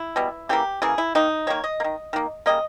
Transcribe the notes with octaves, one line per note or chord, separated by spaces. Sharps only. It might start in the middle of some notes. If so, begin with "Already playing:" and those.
Already playing: E4
B2 G3 B3
C#3 E3 A#3 G4
C#3 E3 A#3 G#4
E4
D#3 A#3 D#4
D#3 A#3 C#5
D#5
A#3
D#3
D#3 A#3
C#3 G3 A#3 D#5